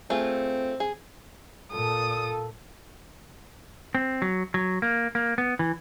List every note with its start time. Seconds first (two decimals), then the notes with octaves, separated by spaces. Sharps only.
0.10 A3 C4 F4 G#4
0.80 G#4
1.72 A#2 F4 A4 D#6
3.95 C4
4.22 F#3
4.54 F#3
4.82 A#3
5.15 A#3
5.38 B3
5.59 E3